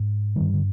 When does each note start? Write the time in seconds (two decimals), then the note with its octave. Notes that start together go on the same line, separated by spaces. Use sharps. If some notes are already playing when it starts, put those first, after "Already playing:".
Already playing: G#2
0.36 G2 D3 D#3 G3
0.54 D3